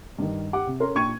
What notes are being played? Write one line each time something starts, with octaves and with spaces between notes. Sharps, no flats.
G2 D#3
G4 F#5 D6
C3
C#4 A4 A#4 C6
A#2 D4 G5 C#6 G#6 D#7